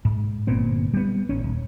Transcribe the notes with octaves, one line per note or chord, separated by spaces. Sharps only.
G#2
G1 A#2 B3 C4
G3 B3
G#1 C#4
D#1